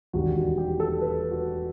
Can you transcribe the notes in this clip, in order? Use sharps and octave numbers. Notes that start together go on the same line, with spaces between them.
E1 D#2 D#3 G3 F#4
F#4
G4
A4
B4
F#4